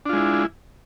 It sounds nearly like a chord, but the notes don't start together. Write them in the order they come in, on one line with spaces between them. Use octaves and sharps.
D4 F4 G#3 E4